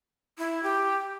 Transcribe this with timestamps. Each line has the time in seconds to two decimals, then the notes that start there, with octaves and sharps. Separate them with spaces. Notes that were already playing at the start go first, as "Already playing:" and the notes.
0.38 E4
0.63 G4